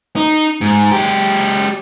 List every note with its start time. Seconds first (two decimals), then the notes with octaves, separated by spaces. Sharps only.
0.16 D#4
0.61 G#2
0.91 G#3 G4